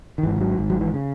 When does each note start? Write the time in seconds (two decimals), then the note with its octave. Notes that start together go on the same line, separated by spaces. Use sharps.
0.18 D#3
0.23 G#1 G#2 E3
0.36 E3
0.41 F#3
0.58 G#1 G#2
0.70 F#3
0.81 E3
0.94 C#3